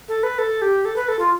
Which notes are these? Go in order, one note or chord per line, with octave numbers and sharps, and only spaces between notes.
A4
B4
A4
G4
A4
B4
A4
F4